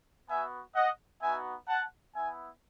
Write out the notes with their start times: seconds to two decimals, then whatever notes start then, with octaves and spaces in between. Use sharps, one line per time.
0.28 B3 F#4 E5 G#5
0.75 D#5 F#5
1.22 B3 D#4 F#4 E5 G#5
1.68 F#5 A5
2.14 B3 E4 E5 G#5